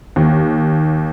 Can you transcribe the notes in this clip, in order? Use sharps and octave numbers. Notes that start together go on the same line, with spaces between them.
D#2